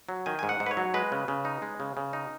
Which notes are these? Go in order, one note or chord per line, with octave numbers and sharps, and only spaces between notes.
F#3
D#3 G#5
G#2 G#5
F#5
G#2
B4
C#5
F#3
G#3 B4
C#3
C#3
D#4
G#3
C#3
C#3
D#4